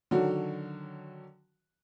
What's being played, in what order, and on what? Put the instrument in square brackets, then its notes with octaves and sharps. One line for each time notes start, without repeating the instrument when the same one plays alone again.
[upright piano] D3 D#3 F#3 F#4